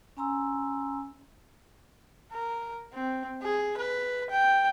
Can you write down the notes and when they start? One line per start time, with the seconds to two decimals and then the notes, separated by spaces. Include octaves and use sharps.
0.17 C#4 G#5 A#5 C6 E6
2.32 A#4
2.93 C4
3.42 G#4
3.78 B4
4.31 G5